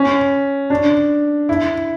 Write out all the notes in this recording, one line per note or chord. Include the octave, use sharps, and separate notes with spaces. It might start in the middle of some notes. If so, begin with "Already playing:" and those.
Already playing: C#4
D4
E4